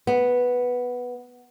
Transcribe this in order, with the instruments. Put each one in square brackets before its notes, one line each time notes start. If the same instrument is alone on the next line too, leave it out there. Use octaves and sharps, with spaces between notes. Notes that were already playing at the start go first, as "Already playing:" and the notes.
[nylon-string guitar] B3